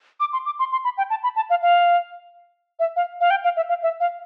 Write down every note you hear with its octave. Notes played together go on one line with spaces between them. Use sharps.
D6
C6
D6
C6
C6
B5
G5
A5
B5
A5
F5
F5
E5
F5
F5
G5
F5
E5
F5
E5
F5